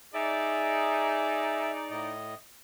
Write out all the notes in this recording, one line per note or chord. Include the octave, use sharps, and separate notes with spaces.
D#4 G#4 D5 E5
A2 D#5